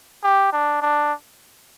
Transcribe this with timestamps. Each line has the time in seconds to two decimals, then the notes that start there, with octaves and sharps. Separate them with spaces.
0.23 G4
0.52 D4
0.82 D4